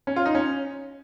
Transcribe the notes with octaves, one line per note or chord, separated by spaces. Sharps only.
C#4
F4
D#4
C#4